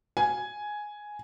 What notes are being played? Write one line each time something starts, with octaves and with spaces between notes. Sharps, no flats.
G#5